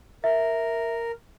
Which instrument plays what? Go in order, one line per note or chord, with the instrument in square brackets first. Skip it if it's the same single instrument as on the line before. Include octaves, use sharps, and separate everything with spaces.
[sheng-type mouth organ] A#4 [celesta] E5